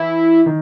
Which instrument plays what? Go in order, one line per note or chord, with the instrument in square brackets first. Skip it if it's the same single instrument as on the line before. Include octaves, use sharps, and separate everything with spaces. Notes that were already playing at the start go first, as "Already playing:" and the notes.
Already playing: [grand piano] E3 [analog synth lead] E4
[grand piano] D#3